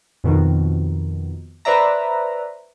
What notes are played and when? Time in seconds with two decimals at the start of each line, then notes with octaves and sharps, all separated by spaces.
0.24 F2 B2 D#3
1.65 B4 C5 D5 E5 A#5